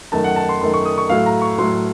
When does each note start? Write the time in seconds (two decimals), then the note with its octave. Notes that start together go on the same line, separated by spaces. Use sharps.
0.12 F#2 D#3 A3 A5
0.24 F#5
0.36 A5
0.49 C6
0.61 F#2 D#3 A3 C6
0.74 C#6
0.85 D#6
0.98 C#6
1.09 A2 F#3 A3 F5
1.26 A#5
1.42 C#6
1.58 A2 F#3 A3 C6